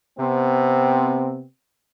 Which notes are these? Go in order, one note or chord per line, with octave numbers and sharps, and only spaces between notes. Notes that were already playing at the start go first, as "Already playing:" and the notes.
C3 B3 C4